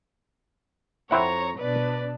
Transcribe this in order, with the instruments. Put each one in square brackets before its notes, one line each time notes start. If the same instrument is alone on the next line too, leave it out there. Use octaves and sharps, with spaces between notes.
[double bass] F2 [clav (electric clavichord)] C4 E4 F#5 [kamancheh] C#5 A#5
[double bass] B2 D4 [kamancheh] B4 D5